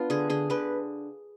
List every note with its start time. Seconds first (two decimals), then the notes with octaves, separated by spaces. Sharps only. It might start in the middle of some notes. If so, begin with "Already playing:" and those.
Already playing: B3 D4 F4
0.10 D3 G#4
0.30 D3 G#4
0.50 D3 B4